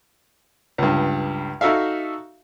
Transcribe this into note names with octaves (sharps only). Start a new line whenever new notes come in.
C#2 G2
D#4 F#4 A4 E5 F5